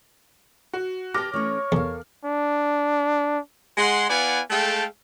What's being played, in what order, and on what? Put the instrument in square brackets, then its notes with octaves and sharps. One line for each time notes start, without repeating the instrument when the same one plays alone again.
[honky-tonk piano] F#4
[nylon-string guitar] G4 B4 A5 [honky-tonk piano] D6 F6 A#6
[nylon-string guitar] E3 A3 C#4 [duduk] C#5
[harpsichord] E2 [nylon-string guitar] A4 A#4 F5
[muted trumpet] D4
[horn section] G#3 F#5 C6
B3 E4 D5 F5 F#5 G#5
G#3 A3 A4 F5 G5